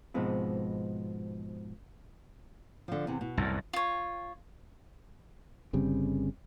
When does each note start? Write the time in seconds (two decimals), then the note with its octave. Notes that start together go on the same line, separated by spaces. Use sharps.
0.14 G#2 B2 F3 G#3 B3 C4
2.88 D3 F3
3.07 E2 C3
3.21 B2
3.37 C2 F#2 A2
3.73 F4 C#5
5.73 G1 C#3 G3 C4